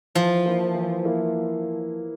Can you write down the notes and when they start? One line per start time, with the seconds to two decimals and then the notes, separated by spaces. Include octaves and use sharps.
0.15 E3 F3
0.45 A#3 E4
0.75 E3
1.05 A#3 E4